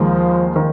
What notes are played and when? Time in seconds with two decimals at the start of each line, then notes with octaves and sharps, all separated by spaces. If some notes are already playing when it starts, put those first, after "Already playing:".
Already playing: D#2 D#3 F3 G#3
0.56 D#3